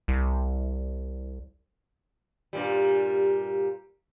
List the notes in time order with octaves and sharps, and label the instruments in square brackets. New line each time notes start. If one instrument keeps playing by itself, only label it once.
[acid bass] C2
[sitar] G2 A#2 G3